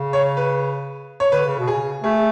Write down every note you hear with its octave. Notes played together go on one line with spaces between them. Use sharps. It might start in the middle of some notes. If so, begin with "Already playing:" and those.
Already playing: C#3
C#5
B4
C#5
D3 B4
C#3
B2
C#3 G#4
A3 G#4